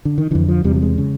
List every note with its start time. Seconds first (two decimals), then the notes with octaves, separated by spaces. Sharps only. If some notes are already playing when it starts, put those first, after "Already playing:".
0.05 D3
0.18 D#3
0.31 F2 D3 E3
0.49 F3
0.64 E2 C3 G3
0.76 G3
0.82 G#3
0.98 C#3